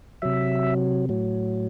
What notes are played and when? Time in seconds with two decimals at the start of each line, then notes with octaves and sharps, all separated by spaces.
0.22 C3 F#3 E5
1.09 A2 F#3